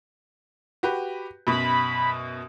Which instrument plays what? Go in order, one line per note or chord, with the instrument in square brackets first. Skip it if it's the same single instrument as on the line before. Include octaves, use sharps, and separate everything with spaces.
[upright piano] F#4 G4 B4
[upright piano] F#2 B2 [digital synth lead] B5